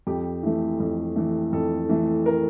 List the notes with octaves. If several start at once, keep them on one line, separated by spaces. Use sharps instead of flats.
F2 G4
E3 A3
F2
E3 A3
F2 A4
E3 A3
A#4